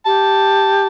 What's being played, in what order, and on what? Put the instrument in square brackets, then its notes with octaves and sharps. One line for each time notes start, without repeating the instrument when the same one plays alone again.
[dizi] G4 [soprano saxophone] A5